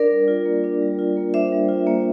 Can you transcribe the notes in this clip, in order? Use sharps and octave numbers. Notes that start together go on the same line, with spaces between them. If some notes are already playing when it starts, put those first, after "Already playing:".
Already playing: D4 A#4 D5
G3
F4
A#3
D4
G3
F4
A#3
D4 C5 E5
G3
F4
A#3